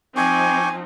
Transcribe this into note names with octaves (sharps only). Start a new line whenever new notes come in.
F3 C4 D#4 G5 G#5 C#6 D6